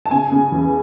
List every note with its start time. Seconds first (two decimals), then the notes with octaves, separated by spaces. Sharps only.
0.06 A5
0.11 C#3 G#5
0.31 C#3
0.52 E2